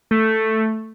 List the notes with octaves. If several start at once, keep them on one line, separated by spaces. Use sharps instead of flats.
A3